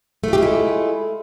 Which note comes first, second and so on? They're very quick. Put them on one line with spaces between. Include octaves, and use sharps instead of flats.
A3 F4 G4 E4 G#3